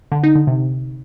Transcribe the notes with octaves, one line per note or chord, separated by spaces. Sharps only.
D3
D#4
D3
C3